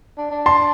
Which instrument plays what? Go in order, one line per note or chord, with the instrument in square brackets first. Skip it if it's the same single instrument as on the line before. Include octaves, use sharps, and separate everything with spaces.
[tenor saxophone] D4
D4
[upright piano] A5 C6